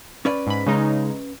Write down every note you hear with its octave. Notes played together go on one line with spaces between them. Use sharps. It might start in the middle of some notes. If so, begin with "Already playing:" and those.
C#4 B4 D5
G#2 B5
C#3 G#3 D#4